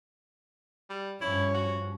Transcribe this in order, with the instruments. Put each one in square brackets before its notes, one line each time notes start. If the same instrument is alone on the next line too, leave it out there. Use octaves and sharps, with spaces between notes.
[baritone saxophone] G3
[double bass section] G2 F3 C#4 [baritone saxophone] E4 [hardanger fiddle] C#5
[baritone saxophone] F#4